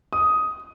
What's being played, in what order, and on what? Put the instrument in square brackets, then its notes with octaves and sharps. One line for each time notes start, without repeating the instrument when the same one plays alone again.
[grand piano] D#6